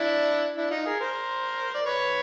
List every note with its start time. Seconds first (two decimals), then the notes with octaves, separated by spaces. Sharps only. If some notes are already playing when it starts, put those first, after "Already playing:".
Already playing: D4 E4
0.57 D4 E4
0.71 D#4 F4
0.86 G#4 A#4
1.00 A#4 C5
1.74 D5
1.86 B4 C#5